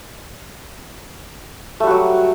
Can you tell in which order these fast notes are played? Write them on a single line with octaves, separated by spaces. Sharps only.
A3 G3 F#4 F#3